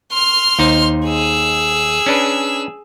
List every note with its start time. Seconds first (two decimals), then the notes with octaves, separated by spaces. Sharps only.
0.12 C6 F6
0.59 D#2 D#4 C5
1.06 G#4 E6
2.06 C#4 D4 B4